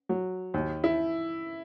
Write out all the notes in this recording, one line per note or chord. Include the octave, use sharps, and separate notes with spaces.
F#3
D#2
E4